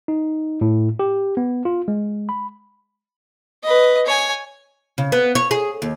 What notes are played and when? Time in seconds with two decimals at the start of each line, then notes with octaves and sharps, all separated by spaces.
0.08 D#4
0.61 A2
0.99 G4
1.37 B3
1.65 F4
1.88 G#3
2.29 B5
3.63 B4 D#5
4.06 C#5 G#5
4.98 C#3
5.12 B3
5.35 C#5
5.51 G#4
5.82 D#2